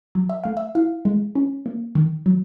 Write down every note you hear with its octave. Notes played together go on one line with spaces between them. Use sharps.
F#3
E5
A3 F5
E5
E4 F5
G#3
C#4
A#3
D#3
F#3